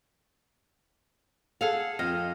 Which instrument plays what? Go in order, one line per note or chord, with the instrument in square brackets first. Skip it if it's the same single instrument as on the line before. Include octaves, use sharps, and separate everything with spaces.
[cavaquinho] G#4 A4 F#5 [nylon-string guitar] F5
[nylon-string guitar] F2 [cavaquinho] D#5 F5 G5